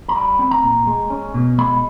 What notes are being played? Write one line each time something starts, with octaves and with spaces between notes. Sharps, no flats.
A#5
G3 B5
C4
A#5
A#2
G#3
C#4
B2
G#3 B5